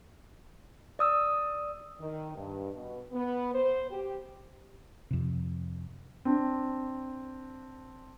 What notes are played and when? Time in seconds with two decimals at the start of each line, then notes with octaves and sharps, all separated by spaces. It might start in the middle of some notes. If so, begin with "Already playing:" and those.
0.99 D5 D#6 E6
1.99 D#3
2.35 G2
2.74 B2
3.12 B3
3.53 C5
3.90 G4
5.11 F2 C3
6.25 C4 D4